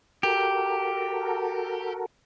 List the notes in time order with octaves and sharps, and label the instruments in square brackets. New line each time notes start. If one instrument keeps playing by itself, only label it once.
[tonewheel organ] F#4 A4 A#4 [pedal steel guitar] G4